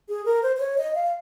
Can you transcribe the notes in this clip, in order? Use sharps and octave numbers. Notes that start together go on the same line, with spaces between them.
G#4
A#4
C5
C5
C#5
D#5
F5